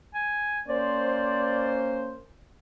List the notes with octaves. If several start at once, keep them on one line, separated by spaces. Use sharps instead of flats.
G#5
A#3 C#4 C5 D5